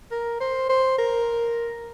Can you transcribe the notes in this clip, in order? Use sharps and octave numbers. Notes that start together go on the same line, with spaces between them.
A#4
C5
C5
A#4